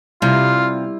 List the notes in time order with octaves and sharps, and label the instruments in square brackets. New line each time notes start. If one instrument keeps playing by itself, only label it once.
[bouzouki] C3 [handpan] G3 E4 [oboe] F4